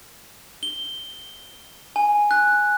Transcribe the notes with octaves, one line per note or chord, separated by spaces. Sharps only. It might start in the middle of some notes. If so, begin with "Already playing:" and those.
G7
G#5
F#6